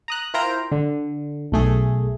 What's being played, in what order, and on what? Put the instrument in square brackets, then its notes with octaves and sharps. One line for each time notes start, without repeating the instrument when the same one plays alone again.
[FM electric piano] A#5 D#6 F#6
E4 F4 A#4 C5 G5 A#5
D3
B1 A3 G#4